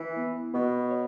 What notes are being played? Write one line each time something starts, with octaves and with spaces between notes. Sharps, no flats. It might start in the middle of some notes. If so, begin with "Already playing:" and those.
Already playing: E3
B3
B2 B3
C#5